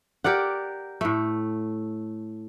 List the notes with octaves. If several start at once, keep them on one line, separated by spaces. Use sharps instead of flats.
G4 A#4 D5 F#5
A2 A3